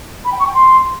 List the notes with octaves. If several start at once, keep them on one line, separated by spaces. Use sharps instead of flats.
B5
G5
C#6
G5
C6